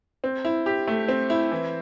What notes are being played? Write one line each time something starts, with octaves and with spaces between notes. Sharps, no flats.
C4
E4
G4
A3
C4
E4
E3